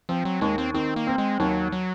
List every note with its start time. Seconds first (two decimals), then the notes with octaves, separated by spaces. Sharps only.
0.09 F3 C4
0.25 F#3
0.41 D#2 G#3
0.58 C4
0.74 D#3 C4
0.96 A#3
1.07 C4
1.18 G#3
1.40 D#2 F#3
1.72 F#3